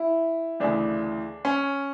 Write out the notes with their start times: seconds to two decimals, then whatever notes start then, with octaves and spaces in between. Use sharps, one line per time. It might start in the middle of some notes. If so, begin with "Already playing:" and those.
Already playing: E4
0.60 D2 C#3 E3 D4
1.45 C#4